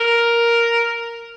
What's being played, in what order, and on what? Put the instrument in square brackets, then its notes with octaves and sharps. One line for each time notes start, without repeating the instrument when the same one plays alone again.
[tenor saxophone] A#4